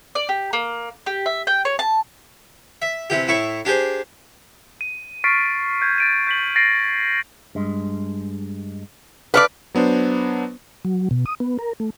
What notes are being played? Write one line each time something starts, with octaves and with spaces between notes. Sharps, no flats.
D5
G4
A#3
G4
E5
G5
C#5
A5
E5
C3 E3 G4
A2 E4 C#6
D4 G4 G#4 C5
D#7
C#6 F6 A6 B6 C7 D7
G6 G#6 D7
A6 D7 D#7
G6 B6 F#7
A6 A#6 C7 D7
G2 G#3
A4 B4 C#5 D5 F5
F#3 B3 D4 C5
F#3
B2
D#6
B3
A#4
A3